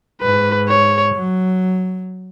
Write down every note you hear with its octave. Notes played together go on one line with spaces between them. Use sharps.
G#2 B4
C#5
F#3